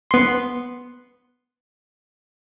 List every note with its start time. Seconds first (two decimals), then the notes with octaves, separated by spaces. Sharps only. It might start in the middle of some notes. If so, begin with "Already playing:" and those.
0.11 B3 C6